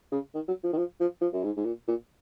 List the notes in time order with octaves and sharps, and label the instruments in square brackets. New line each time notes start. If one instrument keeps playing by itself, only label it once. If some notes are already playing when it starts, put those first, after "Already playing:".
[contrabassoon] C#3
D#3
F#3
F3
D#3
F3
F3
F3
F#2
G#2
G#2
A#2
A#2